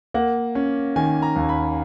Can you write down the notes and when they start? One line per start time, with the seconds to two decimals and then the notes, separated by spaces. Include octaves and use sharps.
0.14 A#3 F#5
0.55 C#4
0.96 D#3 G#5
1.22 A#5
1.36 D#2
1.49 B5